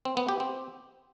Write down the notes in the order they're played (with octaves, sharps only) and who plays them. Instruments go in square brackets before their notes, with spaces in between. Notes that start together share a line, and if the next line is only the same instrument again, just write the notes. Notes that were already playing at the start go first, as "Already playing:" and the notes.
[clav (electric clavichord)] C4
B3
G4
C4